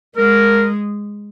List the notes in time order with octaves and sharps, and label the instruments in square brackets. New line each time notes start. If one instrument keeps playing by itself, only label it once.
[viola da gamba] G#3 [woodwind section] A#4